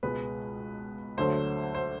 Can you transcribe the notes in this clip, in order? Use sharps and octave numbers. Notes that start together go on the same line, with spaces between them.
C#2 B2 G#3 B4
D2 D3 F#3 A3 C5
C5